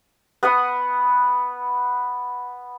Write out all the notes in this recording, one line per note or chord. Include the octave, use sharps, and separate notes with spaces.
B3 B4 F#5 D#6